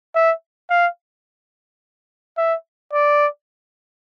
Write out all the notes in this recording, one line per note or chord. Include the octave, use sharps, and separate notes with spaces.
E5
F5
E5
D5